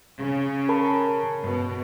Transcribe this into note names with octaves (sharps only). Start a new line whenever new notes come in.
C#3
A#4 A5 B5
G2 B2